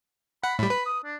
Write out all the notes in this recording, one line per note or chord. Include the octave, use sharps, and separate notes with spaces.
F#5 B5
A2 G3 B5
B4
D#6
D4